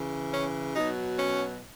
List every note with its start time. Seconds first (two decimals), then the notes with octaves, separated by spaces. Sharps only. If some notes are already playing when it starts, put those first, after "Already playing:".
Already playing: C#3 E3
0.34 C#4
0.76 B2 F#3 D#4
1.19 C#4